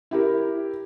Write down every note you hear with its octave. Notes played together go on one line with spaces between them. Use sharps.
E4 G4 A#4